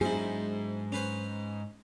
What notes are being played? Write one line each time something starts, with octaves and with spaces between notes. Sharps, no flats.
G#2 F#3 B3 D4 E4 G#4 C5
C#4 B4 C5